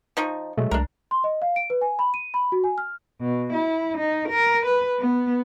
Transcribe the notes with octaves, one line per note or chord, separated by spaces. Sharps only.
F3 D#4 C#6
B2 F#3 G#3 A3
C2 D4 A#4
C6
D#5
F5
D7
B4
G#5
B5
D#7
B5
F#4
G#5
F6
B2
E4
D#4
A#4
B4
B3